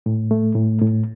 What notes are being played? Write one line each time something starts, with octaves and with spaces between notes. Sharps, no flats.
A2
A3
A2
A2